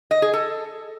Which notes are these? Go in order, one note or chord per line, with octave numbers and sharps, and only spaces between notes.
D#5
G#4
A4